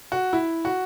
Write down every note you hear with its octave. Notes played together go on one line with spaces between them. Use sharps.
F#4
E4
F#4